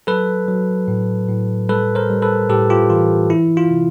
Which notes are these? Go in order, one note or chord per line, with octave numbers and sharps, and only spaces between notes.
F#3 A4 B4
F#3
A2
A2
G3 A4 B4
A#4 C5
G3
A4 B4
A2 G4 A4
F4 G4
E3 F4
E3 E4
F4
C3